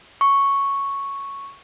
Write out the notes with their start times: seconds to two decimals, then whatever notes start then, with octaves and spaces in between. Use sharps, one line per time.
0.21 C#6